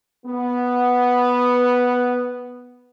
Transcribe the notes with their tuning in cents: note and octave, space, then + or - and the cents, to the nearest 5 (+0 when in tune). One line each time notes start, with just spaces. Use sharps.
B3 +0